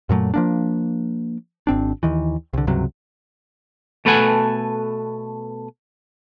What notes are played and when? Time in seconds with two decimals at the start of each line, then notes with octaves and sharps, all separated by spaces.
0.09 F#2 A#2 F#3 A3
0.34 F3 A#3 D4
1.67 G#1 C4 D4
2.03 D#2 D#3 E3
2.53 C2 D3
2.67 C#2 G2 C3 F#3
4.05 B2 A3 A4 B4 F#5 G#5